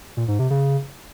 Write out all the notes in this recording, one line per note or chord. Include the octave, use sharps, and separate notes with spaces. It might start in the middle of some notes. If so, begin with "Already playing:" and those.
A#2
G#2
C3
C#3